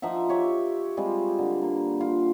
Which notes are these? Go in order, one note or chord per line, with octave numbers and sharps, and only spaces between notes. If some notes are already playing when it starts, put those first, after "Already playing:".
F3 D#4 E5 F#5
G4 C#5 E5 G5
G3 G#3 C4 F4
D3
A#3
F4